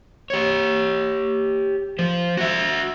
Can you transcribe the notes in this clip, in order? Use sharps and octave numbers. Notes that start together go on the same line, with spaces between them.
G4 C#5
F3 C5
F#4 E5